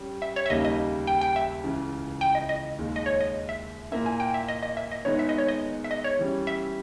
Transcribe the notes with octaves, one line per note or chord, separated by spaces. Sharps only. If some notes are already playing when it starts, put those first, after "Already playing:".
Already playing: G3 C#4
E5
C#5
E5
D#2 C#3 G3 A#3 D#4 D#5
D#5
G5
G5
E5
C#2 C#3 E3
G5
D#5
D#5
D#2 D#3 G#3
D#5
C#5
D#5
E5
A#2 A#3 E4 E5
G#5
G5
E5
D#5
D#5
E5
D#5
D#3 G#3 B3 D#4 G#4 C#5
E5
D#5
C#5
D#5
E5
D#5
C#5
E3 G3 C#4
E5